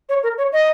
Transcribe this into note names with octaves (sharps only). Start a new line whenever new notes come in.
C#5
A#4
C#5
D#5